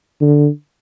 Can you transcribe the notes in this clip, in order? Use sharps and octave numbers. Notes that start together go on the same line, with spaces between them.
D3